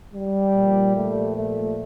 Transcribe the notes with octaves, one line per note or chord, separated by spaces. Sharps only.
G3
A#2 F3
A3
A3